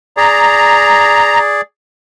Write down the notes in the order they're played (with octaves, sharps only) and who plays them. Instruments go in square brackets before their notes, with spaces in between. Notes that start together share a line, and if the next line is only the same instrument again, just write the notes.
[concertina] G#4 D5 [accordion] A#5